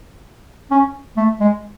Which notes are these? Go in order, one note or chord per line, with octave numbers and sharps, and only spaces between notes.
C#4
A3
G#3